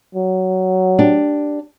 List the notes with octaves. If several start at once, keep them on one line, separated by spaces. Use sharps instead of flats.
F#3
D4 G4